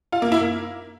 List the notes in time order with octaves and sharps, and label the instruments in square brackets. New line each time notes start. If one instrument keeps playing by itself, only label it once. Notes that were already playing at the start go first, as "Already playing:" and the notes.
[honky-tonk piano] F4
A#3
E4
A#3